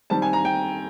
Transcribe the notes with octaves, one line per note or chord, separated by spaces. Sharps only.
D#3 G3 C4 A5
G#5
A#5
G5